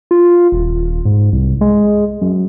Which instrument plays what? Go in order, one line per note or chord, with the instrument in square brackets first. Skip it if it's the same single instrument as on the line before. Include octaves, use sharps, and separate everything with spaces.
[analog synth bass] F4
D#1
G#2
C2
G#3
F#2